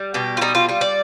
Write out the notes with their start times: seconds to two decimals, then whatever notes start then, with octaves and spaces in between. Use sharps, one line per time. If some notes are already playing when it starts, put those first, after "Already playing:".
Already playing: G3
0.14 B2 G4
0.37 F4
0.41 G3 D#4
0.55 F4
0.69 G3 F4
0.81 D5